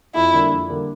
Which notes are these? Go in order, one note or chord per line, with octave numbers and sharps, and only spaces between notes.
F2 E4
D3 G3 A#3 D4
F2
D3 G3 A#3 D4